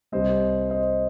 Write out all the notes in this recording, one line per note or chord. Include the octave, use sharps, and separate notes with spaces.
C2 C3 G3 C5 D#5
C5 D#5